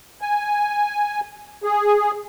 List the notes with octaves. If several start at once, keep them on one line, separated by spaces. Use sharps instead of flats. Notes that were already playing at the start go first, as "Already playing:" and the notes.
G#5
G#4